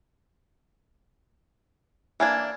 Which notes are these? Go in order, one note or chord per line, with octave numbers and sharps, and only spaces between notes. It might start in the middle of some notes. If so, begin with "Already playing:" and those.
E3 A#3 D4 G#5 G#6